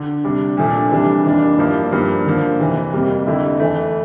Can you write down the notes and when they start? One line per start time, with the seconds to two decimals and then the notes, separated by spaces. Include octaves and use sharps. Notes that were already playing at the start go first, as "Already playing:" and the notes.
Already playing: D3
0.24 C3 G3 D4
0.57 A#2 F3 A3 D4
0.91 C3 E3 G3 D4
1.25 F2 E3 A#3 D4
1.58 G2 F3 A#3 E4
1.91 G2 F3 A#3
2.26 D3 F3 A#3
2.59 F2 C3 E3
2.93 F2 C3 G3 A#3
3.27 F2 D3 A3 E4
3.60 F2 E3 A3